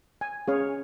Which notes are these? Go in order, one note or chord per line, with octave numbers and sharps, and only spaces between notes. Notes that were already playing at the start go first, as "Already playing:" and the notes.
G#5
C#4 G#4 C#5 F5